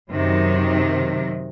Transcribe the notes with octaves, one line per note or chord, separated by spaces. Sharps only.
F#2 C3 D#3